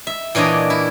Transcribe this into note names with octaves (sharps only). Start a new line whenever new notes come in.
E5
A#2 E3 D4 C#5 D#5
E4